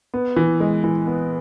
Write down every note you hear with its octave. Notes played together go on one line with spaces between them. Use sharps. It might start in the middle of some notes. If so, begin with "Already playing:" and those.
B3
E3
G#3
E3
B3